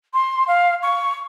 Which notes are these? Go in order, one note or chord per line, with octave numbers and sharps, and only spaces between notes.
C6
F5
C#6